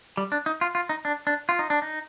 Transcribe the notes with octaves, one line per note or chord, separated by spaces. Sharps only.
G3
D4
D#4
F4
F4
D#4
D4
D4
F4
D#4
D4
D#4